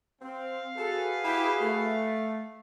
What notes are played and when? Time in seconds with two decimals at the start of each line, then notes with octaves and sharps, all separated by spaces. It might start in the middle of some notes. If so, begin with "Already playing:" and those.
0.22 C4 F5
0.77 F#4 G#4 A4 B4
1.24 E4 G4
1.61 A3